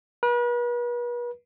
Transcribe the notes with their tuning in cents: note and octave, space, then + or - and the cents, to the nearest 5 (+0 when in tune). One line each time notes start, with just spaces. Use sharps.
B4 -40